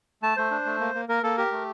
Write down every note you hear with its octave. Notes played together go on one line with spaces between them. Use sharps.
A3 A5
A3 C5
D4
A3
A#3
A#3
A#3 A#4
A#3 A4
G4 A#4
A3